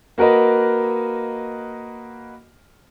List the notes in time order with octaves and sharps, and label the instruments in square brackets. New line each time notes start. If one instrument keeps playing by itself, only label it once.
[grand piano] A#3 F#4 A#4 B4 D#5